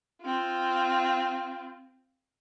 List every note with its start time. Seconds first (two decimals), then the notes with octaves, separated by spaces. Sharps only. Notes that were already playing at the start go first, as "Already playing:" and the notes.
0.23 C4 F4